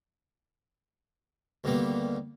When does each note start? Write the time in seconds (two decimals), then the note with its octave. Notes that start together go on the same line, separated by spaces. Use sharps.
1.64 D2 G2 D#3 G3 A#3 B3